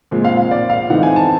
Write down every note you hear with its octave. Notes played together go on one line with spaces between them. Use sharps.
A#2 F3 G#3 C4
F5
F5
D5
F5
E3 A3 C4 D#4 F#5
G#5
A5